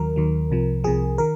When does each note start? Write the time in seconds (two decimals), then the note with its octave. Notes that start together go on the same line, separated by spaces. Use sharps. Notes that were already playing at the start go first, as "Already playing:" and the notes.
Already playing: D#2 D#3 F#3 A#4
0.16 D#2 D#3 F#3
0.51 C2 C3 F3
0.84 C2 C3 F3 G#4
1.18 D#3 A#4